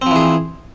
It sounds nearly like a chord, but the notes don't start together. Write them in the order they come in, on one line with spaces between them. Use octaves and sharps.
C4 F3 E3 G#4